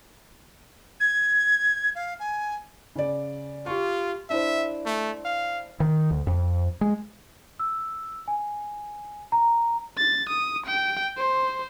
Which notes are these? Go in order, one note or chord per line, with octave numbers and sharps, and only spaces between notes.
G#6
F5
G#5
C#3 D5
F4 G4 C#6
D4 E4 C5 E5
A3
F5
D#3
D2
F2
G#3
E6
G#5
A#5
A6
D#6
G5
C5